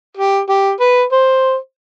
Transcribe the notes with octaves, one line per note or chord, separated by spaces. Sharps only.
G4
G4
B4
C5